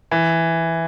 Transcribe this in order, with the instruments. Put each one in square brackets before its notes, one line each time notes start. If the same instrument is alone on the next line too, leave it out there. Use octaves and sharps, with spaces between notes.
[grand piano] E3